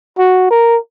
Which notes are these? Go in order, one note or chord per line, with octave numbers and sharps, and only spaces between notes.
F#4
A#4